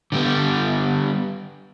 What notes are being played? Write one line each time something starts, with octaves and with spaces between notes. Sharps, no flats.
D3 G3 B3